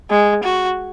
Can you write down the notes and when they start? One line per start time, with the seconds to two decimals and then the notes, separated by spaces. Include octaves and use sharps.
0.10 G#3
0.44 F#4